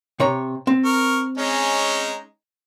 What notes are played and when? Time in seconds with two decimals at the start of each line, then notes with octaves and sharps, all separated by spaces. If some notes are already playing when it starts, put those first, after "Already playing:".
0.20 C3 C#5 A#5
0.67 C4
0.85 A#4 C#6
1.38 G#3 C#4 D#4